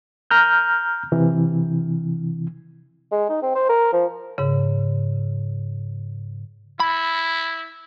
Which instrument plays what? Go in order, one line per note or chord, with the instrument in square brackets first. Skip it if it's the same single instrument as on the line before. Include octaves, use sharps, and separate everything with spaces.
[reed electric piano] A#5 F6 G6
C3 E3
[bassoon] G#3
D#4
C4
C5
A#4
F3
[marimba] G#2 C#3
[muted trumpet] E4 [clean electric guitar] B5